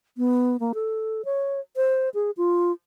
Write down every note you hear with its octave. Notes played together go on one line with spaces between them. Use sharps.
B3
A#3
A4
C#5
C5
G#4
F4